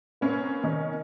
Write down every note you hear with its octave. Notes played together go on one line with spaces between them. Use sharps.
A#3 C4 C#4 B4
D#3 C#4 D#4